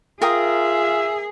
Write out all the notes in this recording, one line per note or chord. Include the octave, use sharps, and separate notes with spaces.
F4 G#4 A#4 E5 G5 D#6